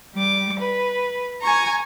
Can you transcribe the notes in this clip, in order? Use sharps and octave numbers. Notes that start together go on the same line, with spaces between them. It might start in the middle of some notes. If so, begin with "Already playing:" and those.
G3 D6
B4
G#5 A#5 C#6